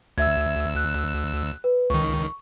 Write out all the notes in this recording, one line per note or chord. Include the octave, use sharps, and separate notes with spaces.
D2 E5 E6 G#6
F#6
B4
C#2 D#3 C#6